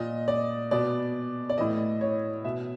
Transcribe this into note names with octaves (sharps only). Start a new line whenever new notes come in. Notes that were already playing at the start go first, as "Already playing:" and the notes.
Already playing: A#2 D#5
D5
B2 D5
D5
A2 E3 D#5
C#5
B2 E5